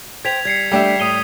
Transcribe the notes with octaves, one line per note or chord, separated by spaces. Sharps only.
C5 G5 G#6 B6 F7
G3 G#6 C7 C#7
G3 A3 D4 G4 E5
A2 D#6 D#7 G7